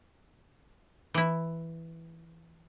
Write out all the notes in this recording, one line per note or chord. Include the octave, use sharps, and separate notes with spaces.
E3 E4